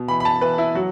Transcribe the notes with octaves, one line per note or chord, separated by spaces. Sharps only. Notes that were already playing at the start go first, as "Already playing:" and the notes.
Already playing: B2
E3 B5
B5
A5
E3 B4
E4
F#3 F#4